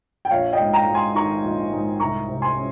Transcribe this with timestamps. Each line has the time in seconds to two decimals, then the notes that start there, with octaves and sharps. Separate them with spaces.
0.25 G5
0.31 A#1 C#5 F5
0.53 D#5 G5
0.59 G#2
0.73 G5 A#5
0.88 G#3
0.94 G#5 C6
1.15 D#3 A#5 C#6
1.44 A#1
1.72 G#2
2.00 C2 A#5 C#6
2.28 C3
2.42 G#5 C6
2.56 C#4